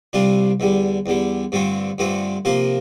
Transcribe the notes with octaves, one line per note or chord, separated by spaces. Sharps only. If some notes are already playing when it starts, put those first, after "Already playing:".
C2 C3 G3 D4 F4
E2 D3 G3
E2 D3 G3
G2 D3 A3 C4 F4
G2 D3 A3 C4 F4
C3 F3 A#3 F4 A#4